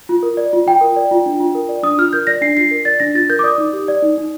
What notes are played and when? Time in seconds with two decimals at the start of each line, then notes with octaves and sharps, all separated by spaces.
0.09 F4
0.23 A#4
0.37 D5
0.53 F4
0.67 F4 G5
0.81 A#4
0.96 D5
1.11 F4
1.26 D4
1.40 F4
1.55 A#4
1.69 D5
1.83 D4 D#6
1.98 F4 F6
2.13 A#4 G6
2.27 D5 A#6
2.42 D4 C7
2.57 F4 C7
2.71 A#4
2.85 D5 A6
3.00 D4 A#6
3.15 F4 A6
3.29 A#4 G6
3.39 D6
3.43 D5 D#6
3.58 D#4
3.73 G4
3.88 D5
4.02 D#4
4.18 D#4